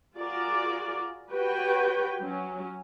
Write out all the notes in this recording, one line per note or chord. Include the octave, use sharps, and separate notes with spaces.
F4 F#4 G#4 A#4 D5
F#4 G4 B4 C#5 G5
F#3 C#4